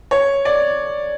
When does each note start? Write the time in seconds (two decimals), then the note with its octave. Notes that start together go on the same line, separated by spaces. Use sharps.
0.11 C#5
0.45 D5